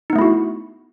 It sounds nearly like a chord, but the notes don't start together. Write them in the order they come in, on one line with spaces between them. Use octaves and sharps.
D#4 B3 A3 E4 F#4